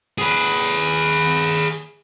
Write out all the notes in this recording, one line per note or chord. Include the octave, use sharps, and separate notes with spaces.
G#4 B4